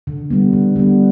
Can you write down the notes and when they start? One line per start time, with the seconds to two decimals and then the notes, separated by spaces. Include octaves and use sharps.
0.07 D3
0.30 G3 B3
0.53 D3
0.76 G3 B3